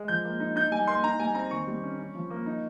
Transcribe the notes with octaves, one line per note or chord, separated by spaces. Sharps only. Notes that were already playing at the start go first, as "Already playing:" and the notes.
Already playing: G#3
F3 G6
A#3
D#4
D#4 G6
G3 G#5
A#3 C6
D#4 A#5
G3 G#5
C4 A#5
D#3 C#6
G3
C#4
C#4
F3
A#3
D#4